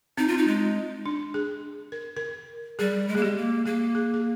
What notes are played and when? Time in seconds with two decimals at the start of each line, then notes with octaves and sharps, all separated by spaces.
0.18 C4 D#4
0.28 F4
0.37 D#4
0.47 G#3
1.06 D4
1.34 G#4
1.92 A#4
2.17 A#4
2.79 G3 G#4
3.08 G#3
3.15 A#3 G#4
3.22 G#3 G4
3.37 A#3
3.66 A#3 G#4
3.95 G#4
4.14 G#4